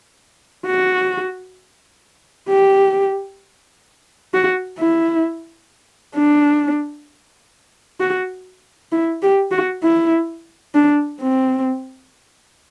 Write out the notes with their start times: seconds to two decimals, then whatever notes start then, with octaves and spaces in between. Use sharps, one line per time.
0.66 F#4
2.49 G4
4.34 F#4
4.79 E4
6.16 D4
8.01 F#4
8.92 E4
9.22 G4
9.52 F#4
9.83 E4
10.75 D4
11.21 C4